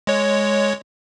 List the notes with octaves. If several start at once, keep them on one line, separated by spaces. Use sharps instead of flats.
G#3 C#5